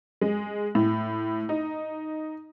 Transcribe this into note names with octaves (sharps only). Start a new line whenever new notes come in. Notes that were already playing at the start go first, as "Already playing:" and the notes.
G#3
A2
D#4